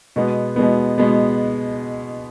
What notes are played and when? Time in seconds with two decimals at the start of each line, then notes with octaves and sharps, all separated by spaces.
0.16 B2 G#3 B3
0.56 B2 G#3 B3
0.98 B2 G#3 B3